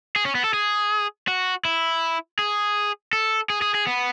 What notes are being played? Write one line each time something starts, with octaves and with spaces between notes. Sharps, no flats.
G#4
C#4
B3
A4
G#4
F#4
E4
G#4
A4
G#4
G#4
G#4
B3